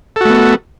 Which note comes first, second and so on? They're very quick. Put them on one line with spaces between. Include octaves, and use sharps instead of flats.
A4 F#4 A3 B3